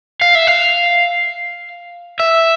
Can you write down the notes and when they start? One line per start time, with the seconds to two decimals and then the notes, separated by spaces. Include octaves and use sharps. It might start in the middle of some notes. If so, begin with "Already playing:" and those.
0.21 F5
0.35 E5
0.47 F5
2.20 E5